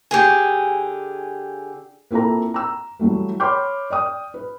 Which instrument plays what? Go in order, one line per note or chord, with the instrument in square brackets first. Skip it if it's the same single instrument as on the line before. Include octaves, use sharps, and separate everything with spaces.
[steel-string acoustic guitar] D3 G4 G#4 G#5
[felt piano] A#3 C4 E4 F4 A4 A#5
A#5 E6
E3 F#3 G3 A3
C#5 B5 C6 D6 F6 G6
D5 G5 D#6
B4